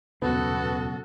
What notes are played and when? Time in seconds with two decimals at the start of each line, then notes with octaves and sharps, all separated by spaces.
0.22 D#1 C#2 F#2 B2 B3 F#4 A4